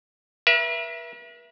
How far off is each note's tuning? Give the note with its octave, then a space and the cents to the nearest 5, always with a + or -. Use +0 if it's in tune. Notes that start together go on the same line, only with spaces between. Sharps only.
B4 -45 E5 +15